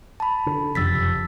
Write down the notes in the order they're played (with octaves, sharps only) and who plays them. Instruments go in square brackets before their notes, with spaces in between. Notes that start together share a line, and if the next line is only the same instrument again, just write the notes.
[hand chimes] A5 B5
[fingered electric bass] D3
[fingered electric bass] F#1 F2 C3 [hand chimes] E6 A6 B6